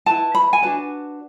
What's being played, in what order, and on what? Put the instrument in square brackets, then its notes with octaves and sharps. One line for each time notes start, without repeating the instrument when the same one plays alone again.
[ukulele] E4 B4 A5
B5
G#5
D4 F#4 B4 A5